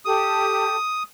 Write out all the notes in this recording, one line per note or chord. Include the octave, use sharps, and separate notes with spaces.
G4 A4 D#6